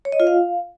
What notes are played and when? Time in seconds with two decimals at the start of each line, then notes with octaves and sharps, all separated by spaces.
0.05 C#5
0.12 D#5
0.20 F4
0.27 F5